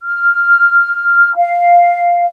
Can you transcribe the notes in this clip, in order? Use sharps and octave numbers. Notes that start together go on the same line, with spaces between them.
F6
F5